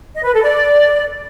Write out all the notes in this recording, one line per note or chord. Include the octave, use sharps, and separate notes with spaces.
D#5
B4
A4
D5